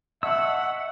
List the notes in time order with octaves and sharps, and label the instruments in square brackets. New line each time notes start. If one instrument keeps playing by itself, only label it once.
[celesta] D#5 A5 C#6 [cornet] E5 [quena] F#5 [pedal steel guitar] E6